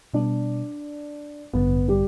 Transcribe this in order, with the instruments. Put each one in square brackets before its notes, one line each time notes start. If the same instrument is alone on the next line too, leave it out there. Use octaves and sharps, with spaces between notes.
[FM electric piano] B2 G3 B3 [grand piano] D4 D5
[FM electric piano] A1 G2 D3 [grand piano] B3 B4
[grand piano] G3 G4